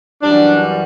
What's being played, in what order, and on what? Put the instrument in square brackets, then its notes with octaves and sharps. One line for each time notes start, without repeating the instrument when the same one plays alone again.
[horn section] F#2 E3 G3 D4